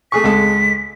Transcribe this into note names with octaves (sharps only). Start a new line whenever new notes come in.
A3 G#4 C#6 B6
C#2 G#3 A4